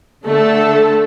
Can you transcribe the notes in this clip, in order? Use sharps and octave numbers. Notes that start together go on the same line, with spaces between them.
D3 A3 A4